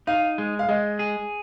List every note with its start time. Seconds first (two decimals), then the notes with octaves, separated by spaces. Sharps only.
0.07 D#4 F5
0.38 G#3
0.59 F5
0.69 G#3 D#5
0.99 G#4